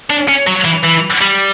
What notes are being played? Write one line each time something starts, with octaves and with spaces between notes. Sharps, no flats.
D4
C#4
F#3
E3
E3
G3